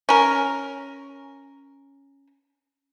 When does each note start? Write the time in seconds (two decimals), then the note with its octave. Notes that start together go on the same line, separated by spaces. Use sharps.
0.09 C#4 A#4